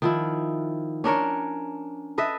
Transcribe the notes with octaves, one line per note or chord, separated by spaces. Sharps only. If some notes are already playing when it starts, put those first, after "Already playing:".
D#3 F3 E4
C#4 D4 A#4 C#5
A4 B4 D#5 E5